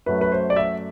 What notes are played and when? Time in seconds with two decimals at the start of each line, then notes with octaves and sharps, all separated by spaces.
0.06 F#2 F#3 A3 B4
0.21 B4
0.32 C5
0.50 D5
0.56 E5